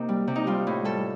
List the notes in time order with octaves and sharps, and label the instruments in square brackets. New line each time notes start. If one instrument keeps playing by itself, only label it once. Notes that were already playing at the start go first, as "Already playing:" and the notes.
Already playing: [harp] C3 A#3 D#4
G3
C3
D#4
G3 F4
A2
G3 A4